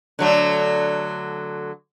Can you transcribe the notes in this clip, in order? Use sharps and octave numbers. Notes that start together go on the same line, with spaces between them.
D3 F#3 A3